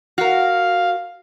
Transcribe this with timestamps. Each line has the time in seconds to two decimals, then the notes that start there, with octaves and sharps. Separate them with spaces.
0.18 F#4 A#4 F5